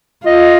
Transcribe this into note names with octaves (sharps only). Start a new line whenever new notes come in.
F4 D#5